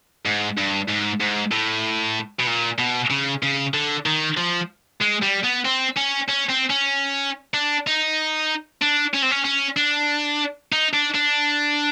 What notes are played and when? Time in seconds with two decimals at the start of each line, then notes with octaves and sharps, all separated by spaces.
0.25 G#2
0.57 G2
0.88 G#2
1.20 G#2
1.51 A2
2.39 B2
2.47 A#2
2.78 B2
3.10 C#3
3.43 C#3
3.74 D3
4.06 D#3
4.37 F3
5.01 G#3
5.22 G3
5.43 B3
5.65 C4
5.97 C#4
6.28 C#4
6.49 C4
6.70 C#4
7.54 D4
7.87 D#4
8.82 D4
9.14 C#4
9.22 C4
9.31 C#4
9.44 C#4
9.76 D4
10.72 D#4
10.93 D4
11.14 D4